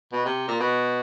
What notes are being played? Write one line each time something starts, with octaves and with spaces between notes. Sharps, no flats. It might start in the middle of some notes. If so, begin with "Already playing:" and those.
B2
C3
A#2
B2